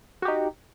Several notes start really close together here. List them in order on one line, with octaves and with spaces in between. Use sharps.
F#4 G4 D#4